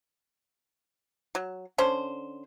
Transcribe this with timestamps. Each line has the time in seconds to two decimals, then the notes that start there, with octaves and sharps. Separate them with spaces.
1.35 F#3
1.78 D3 C#4 C5